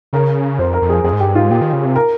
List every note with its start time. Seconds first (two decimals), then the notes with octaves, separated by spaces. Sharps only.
0.13 C#3 A#4
0.59 F2 C5
0.74 A#4
0.82 F2
0.89 G#4
1.04 F2 G#4
1.13 G#2
1.20 G2 G4
1.35 G#2 F4
1.50 A#2 G4
1.61 D#3
1.73 C#3
1.85 C3
1.96 A#4